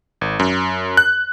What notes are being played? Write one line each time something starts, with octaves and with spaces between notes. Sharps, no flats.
G#1
F#2
F#6